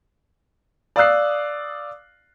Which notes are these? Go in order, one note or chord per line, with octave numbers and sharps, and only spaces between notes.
D5 F5 D#6 E6 F#6 C7